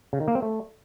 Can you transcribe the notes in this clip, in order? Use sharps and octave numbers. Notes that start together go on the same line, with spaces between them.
C#3
D#3
A#3
C4
A3